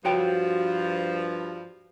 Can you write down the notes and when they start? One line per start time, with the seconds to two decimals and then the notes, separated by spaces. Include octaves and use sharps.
0.05 G2 F3 F#4 C#5 G5